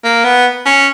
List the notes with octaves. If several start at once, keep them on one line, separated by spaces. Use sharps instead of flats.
A#3
B3
C#4